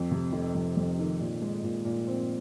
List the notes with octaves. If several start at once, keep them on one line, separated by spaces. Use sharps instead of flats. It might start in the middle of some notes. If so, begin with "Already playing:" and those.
Already playing: F2
C3
F1
F2
F2
D#3
A#2
G#3
A#2
A#2
C4